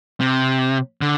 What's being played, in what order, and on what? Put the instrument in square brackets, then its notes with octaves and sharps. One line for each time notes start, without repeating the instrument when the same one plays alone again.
[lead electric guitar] C3
D3